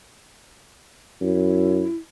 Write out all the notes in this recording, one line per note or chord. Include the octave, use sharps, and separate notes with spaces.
F#2 E4